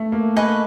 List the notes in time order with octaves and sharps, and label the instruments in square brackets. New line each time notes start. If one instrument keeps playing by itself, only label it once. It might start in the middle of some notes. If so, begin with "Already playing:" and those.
Already playing: [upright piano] A3
A#3
[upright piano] A#3 [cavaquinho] B4 D#5 G#5 C#6